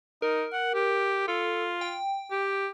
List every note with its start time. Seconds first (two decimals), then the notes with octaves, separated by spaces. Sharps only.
0.22 D#4 A#4
0.53 F#5
0.74 G4
1.28 F4 A4
1.81 G5
2.31 G4